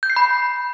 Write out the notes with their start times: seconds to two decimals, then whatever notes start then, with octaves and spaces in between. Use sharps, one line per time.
0.03 G6
0.10 C7
0.16 B5